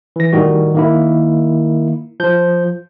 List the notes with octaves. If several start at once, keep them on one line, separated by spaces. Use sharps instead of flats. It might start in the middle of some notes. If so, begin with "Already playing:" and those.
E3 A#6
A2 D#3 G3 F#4
D#3 A#3 E4
F3 G6